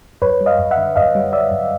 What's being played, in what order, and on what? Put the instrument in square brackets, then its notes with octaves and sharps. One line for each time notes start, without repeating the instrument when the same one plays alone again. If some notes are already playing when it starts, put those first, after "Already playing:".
[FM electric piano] F#2 B4 C#5
G3
D#5 F5
F#2
E5 F#5
D3
F#2 D#5 F5
G3
F#2 D5 E5
F#2